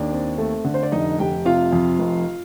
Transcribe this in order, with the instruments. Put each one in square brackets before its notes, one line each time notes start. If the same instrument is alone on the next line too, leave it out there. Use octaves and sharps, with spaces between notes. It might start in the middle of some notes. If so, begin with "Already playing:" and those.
Already playing: [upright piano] D#2 D4 D5
C4
A3
D3
C5
D5
F1 D#4 D#5
F1 G4 G5
C3 F4 F5
F2
F1